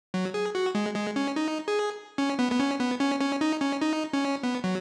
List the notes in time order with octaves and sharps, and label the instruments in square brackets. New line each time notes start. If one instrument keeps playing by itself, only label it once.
[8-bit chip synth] F#3
G#4
F#4
G#3
G#3
C#4
D#4
G#4
C#4
B3
B3
C#4
B3
C#4
C#4
D#4
C#4
D#4
C#4
B3
F#3